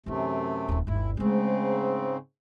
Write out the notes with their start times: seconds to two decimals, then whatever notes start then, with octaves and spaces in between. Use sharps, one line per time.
0.06 F#2 C3 E3 A3 D#4
0.69 D#1 D#2
0.87 G1 D#2 E4
1.17 G#2 C#3 G#3 A3 C4